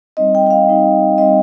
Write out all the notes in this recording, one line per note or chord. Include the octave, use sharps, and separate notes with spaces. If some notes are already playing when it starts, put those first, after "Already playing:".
G3 C4 D#4 D#5
G5
G5
F5
G3 C4 D#4
G3 C4 D#4 D#5